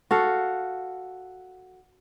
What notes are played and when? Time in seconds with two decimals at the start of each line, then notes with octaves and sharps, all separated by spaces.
0.11 F#4 A4 F5